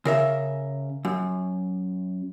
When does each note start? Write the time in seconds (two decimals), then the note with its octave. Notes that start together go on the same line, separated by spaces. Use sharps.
0.05 C#3 A#4 E5
1.05 F#2